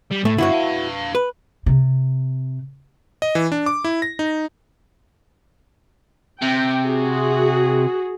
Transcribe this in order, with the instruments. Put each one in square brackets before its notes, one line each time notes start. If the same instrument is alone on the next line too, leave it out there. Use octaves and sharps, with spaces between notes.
[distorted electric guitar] G3
[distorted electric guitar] A2 [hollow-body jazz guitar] A3
[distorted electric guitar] G2 D3 [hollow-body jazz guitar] E4 F#4 C#5
[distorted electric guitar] B4 F5
[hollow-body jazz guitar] B4
[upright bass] C3
[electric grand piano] D#5
E3
D4
D6
E4
A#6
D#4
[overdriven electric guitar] C3 [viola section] G5
[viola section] F#4 G#4